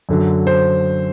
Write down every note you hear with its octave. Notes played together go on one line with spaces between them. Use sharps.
F#2 D3 F#3
C5